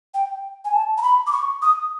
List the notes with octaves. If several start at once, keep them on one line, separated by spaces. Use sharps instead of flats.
G5
G#5
A5
A#5
B5
D6
C#6
D#6